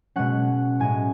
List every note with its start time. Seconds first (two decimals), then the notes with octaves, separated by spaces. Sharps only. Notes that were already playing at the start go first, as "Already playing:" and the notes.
0.16 B2 G#3 C#4 F#5
0.80 A2 G#3 C#4 G#5